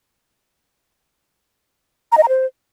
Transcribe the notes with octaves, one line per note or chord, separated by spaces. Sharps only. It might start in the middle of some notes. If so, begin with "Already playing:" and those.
A#5
D#5
A#5
C5